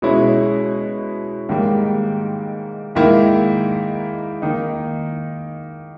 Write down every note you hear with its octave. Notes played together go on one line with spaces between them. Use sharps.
B2 G#3 C#4 E4
G#2 D#3 G3 A#3
G#2 D#3 A#3 E4
D#3 A#3 D#4